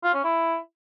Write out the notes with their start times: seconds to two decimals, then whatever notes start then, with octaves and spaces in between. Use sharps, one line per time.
0.04 F4
0.14 C#4
0.24 E4